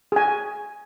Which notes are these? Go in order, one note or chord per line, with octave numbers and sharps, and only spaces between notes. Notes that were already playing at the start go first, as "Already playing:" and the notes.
G#4 G#5